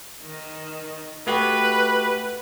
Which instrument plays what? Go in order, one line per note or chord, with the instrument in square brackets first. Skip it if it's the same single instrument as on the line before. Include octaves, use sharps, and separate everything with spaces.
[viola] D#3
[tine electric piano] A3 F#4 G4 [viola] B4